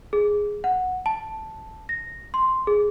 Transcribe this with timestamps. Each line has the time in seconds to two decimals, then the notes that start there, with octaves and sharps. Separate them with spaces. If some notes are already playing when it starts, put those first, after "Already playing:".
0.13 G#4
0.64 F#5
1.06 A5
1.89 A#6
2.34 C6
2.67 G#4